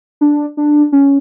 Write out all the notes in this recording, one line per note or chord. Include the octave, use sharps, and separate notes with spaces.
D4
D4
C#4